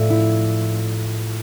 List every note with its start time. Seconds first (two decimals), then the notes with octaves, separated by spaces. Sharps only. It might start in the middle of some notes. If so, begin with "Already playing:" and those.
Already playing: A2 F3 D5 E5
0.10 E4